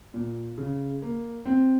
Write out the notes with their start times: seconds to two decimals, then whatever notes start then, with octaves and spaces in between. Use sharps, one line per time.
0.14 A#2
0.58 C#3
1.02 A#3
1.45 C4